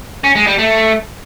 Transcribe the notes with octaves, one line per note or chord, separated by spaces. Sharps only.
C#4
G#3
G3
A3